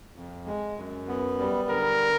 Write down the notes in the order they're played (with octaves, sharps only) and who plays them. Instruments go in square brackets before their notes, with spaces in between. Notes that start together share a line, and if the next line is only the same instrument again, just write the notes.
[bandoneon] F2
G#3
F#2
B3
G3
[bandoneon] D3 [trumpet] A#4